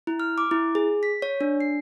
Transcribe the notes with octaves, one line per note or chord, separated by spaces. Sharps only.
E4
F6
D6
E4
G#4
B6
C#5
D4
C7